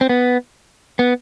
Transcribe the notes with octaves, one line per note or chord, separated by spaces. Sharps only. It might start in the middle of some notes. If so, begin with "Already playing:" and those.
C4
B3
B3